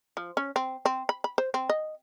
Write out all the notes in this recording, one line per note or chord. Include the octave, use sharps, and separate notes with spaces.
F3
C#4
C4
C4
B5
B5
C5
C4
D#5